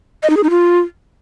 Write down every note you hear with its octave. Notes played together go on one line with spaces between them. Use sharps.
D#5
D#4
G#4
D#4
F4